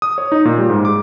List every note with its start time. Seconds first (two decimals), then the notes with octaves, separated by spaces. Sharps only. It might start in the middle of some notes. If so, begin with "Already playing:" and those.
0.02 D#6
0.18 C#5
0.32 D#4
0.45 A#2
0.58 G3
0.70 G#2
0.85 D6